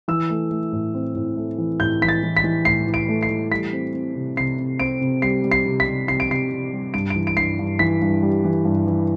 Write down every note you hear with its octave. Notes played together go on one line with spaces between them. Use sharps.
E3 E6
A3
A3
A2
C4
A2
A3
E3
A2 G6
E3 B6
A6
E3
B6
E3
A2 C7
E3
D7
A3
C7
E3
G3 B6
C4
C4
C3
C3 C7
C3
C4 D7
C3
G3 C7
G3
C7
C3
B6
C3
C3 C7
D7
C3 C7
C3
G3
G2 D7
D7
E3
D7
G2 C7
G2
E3 B6
G2
G3
E3
G2
E3